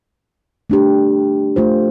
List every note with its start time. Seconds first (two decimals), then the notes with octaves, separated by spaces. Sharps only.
0.70 A3 D4 G4
1.56 A3 F4 C5